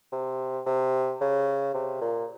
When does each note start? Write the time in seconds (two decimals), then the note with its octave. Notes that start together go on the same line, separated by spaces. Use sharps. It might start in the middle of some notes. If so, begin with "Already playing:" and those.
0.12 C3
0.66 C3
1.21 C#3
1.74 C3
2.01 A#2